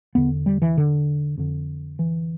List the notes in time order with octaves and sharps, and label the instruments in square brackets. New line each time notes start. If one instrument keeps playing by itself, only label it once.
[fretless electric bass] E2 D3 B3
G3
E3
D3
F2 D3
E3